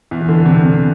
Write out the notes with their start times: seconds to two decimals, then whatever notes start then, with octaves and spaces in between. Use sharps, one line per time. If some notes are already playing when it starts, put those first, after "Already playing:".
0.11 E2 E3
0.21 E3
0.29 D3
0.46 C3
0.63 C3